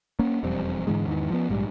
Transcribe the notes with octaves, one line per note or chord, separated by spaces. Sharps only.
A#3 C#4
E1 F2 G3 C4
G#2 D3 E3 G#3
E2 G#2 D#3 E3
F3 B3
A#1 G#2 G3